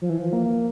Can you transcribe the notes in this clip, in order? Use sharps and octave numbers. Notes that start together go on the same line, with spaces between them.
F3
E3
F3
A#3